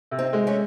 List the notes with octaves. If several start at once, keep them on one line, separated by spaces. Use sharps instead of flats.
C3
C4 D#4
G#3
A3 C#4